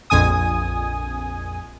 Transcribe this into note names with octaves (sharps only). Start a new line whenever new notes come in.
A#1 F2 G#5 D#6